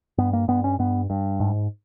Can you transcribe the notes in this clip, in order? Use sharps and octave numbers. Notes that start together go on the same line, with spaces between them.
G2 B3
A#3
G2 B3
C#4
G2 B3
G2
G#2